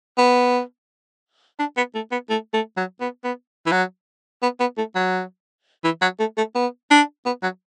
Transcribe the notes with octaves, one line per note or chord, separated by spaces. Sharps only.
B3
D4
B3
A3
B3
A3
A3
F#3
B3
B3
E3
F#3
B3
B3
A3
F#3
E3
F#3
A3
A3
B3
D4
B3
F#3